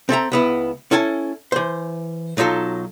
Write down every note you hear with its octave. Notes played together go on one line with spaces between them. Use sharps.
C4 A4 E5 A#5
C#2 B3 E4
C#4 E4 A4 G#5 A5
E3 C5
B1 F#3 D#4 F4 A4